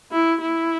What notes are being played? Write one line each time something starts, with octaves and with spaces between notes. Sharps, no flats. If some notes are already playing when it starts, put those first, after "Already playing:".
E4
E4